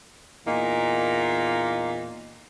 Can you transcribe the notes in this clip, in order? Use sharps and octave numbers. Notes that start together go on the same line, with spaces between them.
E2 A#2 A#3 D#4